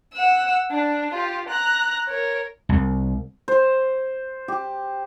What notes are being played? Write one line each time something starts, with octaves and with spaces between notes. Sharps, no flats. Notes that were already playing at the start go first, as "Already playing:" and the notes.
F#5 E6
D4
F4 G4
A#5 F#6
A#4 C#5
C2
C5
G4